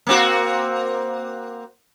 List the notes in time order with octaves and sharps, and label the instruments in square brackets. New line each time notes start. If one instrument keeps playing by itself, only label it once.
[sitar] A#3 C4 F#4